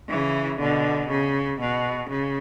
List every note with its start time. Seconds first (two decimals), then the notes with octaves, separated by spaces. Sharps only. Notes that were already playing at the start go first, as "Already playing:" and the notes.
0.09 C#3 E3
0.59 B2 D3
1.10 C#3
1.60 B2
2.10 C#3